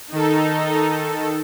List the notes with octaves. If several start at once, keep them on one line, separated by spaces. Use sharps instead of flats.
D#3 D#4 A4